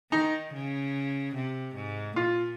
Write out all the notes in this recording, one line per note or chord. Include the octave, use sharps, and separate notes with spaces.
D#3 D#4
C#3
C3
G#2
A#2 F4